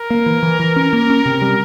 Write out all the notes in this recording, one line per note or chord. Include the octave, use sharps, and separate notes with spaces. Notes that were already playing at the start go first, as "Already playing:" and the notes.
Already playing: A#4
A#3
E3
E3
E3
C#4
A#3
C#4
C3
G3